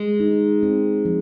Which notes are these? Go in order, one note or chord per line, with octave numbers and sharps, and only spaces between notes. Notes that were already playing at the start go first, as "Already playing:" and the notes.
Already playing: G#3
D#4
C4
F3